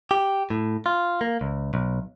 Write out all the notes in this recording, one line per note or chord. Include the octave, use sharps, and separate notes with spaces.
G4
A2
F4
A#3
C#2
B1